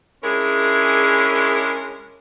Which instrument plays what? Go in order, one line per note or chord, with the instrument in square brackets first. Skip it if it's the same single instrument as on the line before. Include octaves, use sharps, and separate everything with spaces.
[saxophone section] G#3 C#4 D4 E4 G#4 A#4